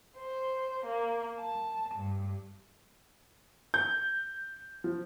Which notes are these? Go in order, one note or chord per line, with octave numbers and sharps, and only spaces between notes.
C5
A#3
A5
G2
G6
F3